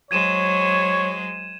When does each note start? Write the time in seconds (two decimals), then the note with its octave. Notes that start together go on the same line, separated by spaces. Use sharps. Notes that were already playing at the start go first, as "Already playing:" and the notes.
0.11 F#3 G#3 C5 C#5 G#6 D#7 E7